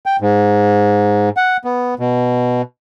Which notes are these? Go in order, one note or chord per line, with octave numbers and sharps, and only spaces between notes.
G5
G#2
F#5
B3
B2